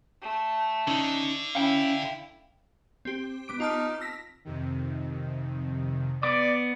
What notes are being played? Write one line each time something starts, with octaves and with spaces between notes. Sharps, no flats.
A3
D3 C#4 D#4
C#4 E4 F5 G5
C4 G4
B3 D6 D7
D#4 F4 A5 F6
E6 A#6 B6
F2 C3 D#3
B3 D5 D6